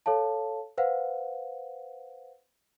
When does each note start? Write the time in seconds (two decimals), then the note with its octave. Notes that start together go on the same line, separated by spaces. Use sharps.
0.06 A4 C#5 F5 A5
0.78 B4 C5 F5 F#5